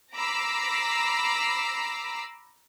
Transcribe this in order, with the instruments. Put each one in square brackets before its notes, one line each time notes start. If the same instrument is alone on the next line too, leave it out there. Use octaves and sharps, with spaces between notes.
[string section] A#5 B5 D6 E6 B6 C7